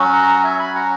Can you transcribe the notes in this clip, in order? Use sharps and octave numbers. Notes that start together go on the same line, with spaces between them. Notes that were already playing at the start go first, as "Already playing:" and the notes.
Already playing: F#3 C#4 F#4
F#5 A#5
E5 G#5
G#5 B5
F#5 A#5